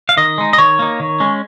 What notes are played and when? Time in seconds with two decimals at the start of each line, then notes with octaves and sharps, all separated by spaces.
0.09 F5
0.17 D#3 D#5
0.38 G#3 D#4
0.53 D#5
0.58 D#3 C#5
0.79 A#3 D#4
1.00 D#3
1.20 G#3 C#4